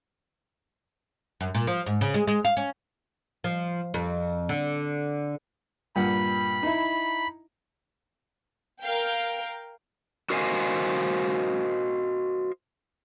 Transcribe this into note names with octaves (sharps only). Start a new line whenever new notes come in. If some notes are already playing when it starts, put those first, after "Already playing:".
F#2
A#2
F3
G#2
C#3
G#3
G#3
F5
C#4
F3
F2
D3
G2 A#2 F#5 B5
D#4 E4
A#4 F5 G5
F#4 A#4 C5 D#5 F5 G#5